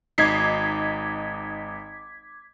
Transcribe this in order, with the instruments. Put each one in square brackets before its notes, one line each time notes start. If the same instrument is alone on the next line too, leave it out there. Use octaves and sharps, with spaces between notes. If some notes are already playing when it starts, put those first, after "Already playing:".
[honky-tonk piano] G#1 D#4 C7 [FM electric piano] D6 G#6 B6